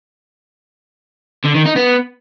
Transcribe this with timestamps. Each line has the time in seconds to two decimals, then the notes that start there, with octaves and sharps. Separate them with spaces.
1.45 D3
1.55 D#3
1.66 D#4
1.76 B3